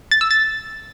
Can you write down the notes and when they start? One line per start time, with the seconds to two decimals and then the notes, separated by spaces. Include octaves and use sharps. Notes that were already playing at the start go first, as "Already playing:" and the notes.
0.11 A6
0.21 E6
0.31 A6